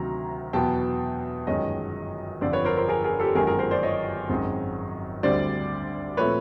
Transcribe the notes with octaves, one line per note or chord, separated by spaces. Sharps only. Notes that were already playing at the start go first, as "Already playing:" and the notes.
Already playing: D2 C3 D#3 F#3 A#5
E2 B2 F#3 B3 G5 A5
G1 F#2 D#3 G#3 C#5 D#5
G1 F2 D3 F3 C5 D5
B4 C#5
A#4 C5
A#4 C5
G#4 A#4
G#4 A#4
G4 A4
G1 F#2 D#3 G#3 B3 G#4 A#4
G#4 A#4
A#4 C5
C5 D5
C#5 D#5
G#1 F#2 D#3 G#3 C4
D2 D3 G3 C4 C5 D5
A#2 F3 A3 C4 B4 C#5